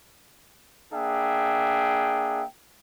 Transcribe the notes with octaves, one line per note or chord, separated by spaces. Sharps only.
A#3 D4 G#4 E5 G5